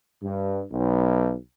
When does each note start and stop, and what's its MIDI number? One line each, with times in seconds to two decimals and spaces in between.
0.23 0.62 43
0.72 1.34 35